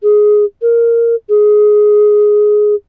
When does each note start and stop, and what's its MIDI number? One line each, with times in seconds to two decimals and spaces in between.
0.03 0.45 68
0.62 1.15 70
1.29 2.75 68